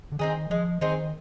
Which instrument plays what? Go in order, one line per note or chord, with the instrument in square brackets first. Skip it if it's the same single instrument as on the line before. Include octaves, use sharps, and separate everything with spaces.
[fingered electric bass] D3
[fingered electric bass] D#3 [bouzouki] C4 D#4 G#4
[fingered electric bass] F3 [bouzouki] G#3
[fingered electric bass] D#3 [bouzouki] C4 D#4 G#4